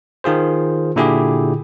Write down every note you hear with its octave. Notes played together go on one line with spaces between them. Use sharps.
D#3 F4 G#4 C5
A#2 D3 E4 G4 G#4